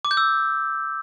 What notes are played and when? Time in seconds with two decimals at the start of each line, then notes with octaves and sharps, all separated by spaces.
0.05 D6
0.11 G6
0.17 E6